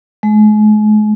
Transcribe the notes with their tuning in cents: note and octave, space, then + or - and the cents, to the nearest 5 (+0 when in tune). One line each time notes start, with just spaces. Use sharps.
G#3 +40